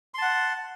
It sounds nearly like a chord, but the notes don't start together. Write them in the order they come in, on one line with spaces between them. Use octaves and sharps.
C6 A5 F#5